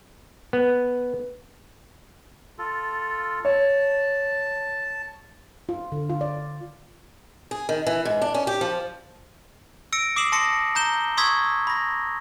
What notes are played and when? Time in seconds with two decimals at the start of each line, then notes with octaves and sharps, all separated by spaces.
0.53 B3
2.58 F4 A4
3.45 C#5 A5
5.69 F4
5.92 D3
6.10 F4
6.21 D5
7.51 G#4
7.69 D#3
7.87 E3
8.05 G#2
8.21 D4
8.34 C#4
8.47 G4
8.61 F3
9.93 E6 A#6 C#7 D7
10.16 D6 D#6 C7 E7 F#7
10.32 A5 C6 D#6 A#6 C#7
10.75 A#5 G6 E7 G7
11.17 C6 C#6 D#6 E6 G#6 B6
11.67 B5 A#6